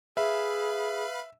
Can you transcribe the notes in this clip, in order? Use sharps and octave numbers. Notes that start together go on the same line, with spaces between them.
G#4 B4 E5 F5 B5